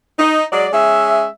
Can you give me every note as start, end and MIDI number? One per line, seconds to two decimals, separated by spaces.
0.19 0.44 63
0.52 0.67 54
0.52 0.67 56
0.52 0.67 74
0.73 1.26 56
0.73 1.26 61
0.73 1.26 76